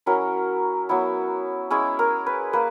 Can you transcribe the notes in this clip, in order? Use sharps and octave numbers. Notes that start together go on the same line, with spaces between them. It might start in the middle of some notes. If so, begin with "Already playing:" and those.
F#3 C#4 E4 A#4
F#3 B3 E4
G#3 C#4 E4 G#4
A#4
B4
A#3 B4